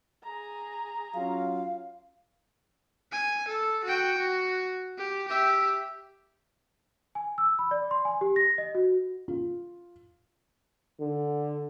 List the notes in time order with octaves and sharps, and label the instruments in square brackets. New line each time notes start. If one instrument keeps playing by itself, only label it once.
[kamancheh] G#4 A#5
[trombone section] F#3 C#4 F4 [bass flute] F5
[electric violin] G#5
A4
F#4 G5
F#4
G4
G4 E5
[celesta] G#5
E6
B5
D5
C6
G#5
G4
A#6
D#5
F#4
[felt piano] F4
[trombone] D3